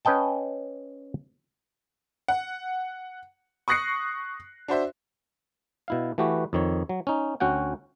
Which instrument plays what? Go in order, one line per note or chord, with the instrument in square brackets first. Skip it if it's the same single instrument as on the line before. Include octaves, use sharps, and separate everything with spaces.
[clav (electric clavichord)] C#4 B4 D#5 G5 A5
[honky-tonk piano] F#5
C#6 D#6 F#6 A#6 C7 C#7
D4 F#4 C5 E5
[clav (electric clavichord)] B2 E4 F5
E3 A3 F#4 G4 B4
F2 D#3 C#5
F#3
C#4 D#4
D2 C#4 F#4 F#5 G5